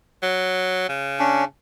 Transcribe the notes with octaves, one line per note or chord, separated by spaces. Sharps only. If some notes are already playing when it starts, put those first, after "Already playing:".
F#3
C#3
C#4 D4